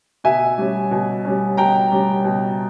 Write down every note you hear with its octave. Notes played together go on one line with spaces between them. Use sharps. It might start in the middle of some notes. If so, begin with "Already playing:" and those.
B2 E5 G#5
G3 C#4
B2
G3 C#4
B2 G5 A#5
G3 C#4
B2